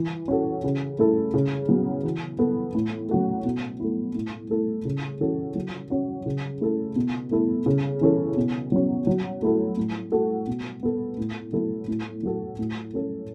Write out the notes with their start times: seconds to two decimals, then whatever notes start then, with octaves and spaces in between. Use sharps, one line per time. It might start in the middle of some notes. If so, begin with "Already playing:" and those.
Already playing: E3
0.28 C#4 F#4 A4
0.64 C#3
0.99 A3 E4 A4
1.34 C#3
1.69 F#3 B3
2.04 E3
2.39 B3 A4
2.75 A2
3.09 F#3 C#4 F#4 A4
3.45 B2
3.80 A3 E4
4.15 A2
4.49 A3 E4 A4
4.85 C#3
5.21 E3 C#4 F#4 A4
5.55 F#3
5.90 C#4 F#4
6.26 C#3
6.61 A3 E4 A4
6.96 B2
7.31 A3 E4 A4
7.66 C#3
8.01 E3 C#4 A4
8.37 B2
8.72 F#3 C#4
9.07 F#3
9.42 A3 E4 A4
9.77 A2
10.12 A3 F#4 A4
10.47 B2
10.83 B3 A4
11.18 A2
11.53 F#3 B3 E4 A4
11.88 A2
12.23 F#3 A3 F#4 A4
12.59 A2
12.93 A3 C#4 A4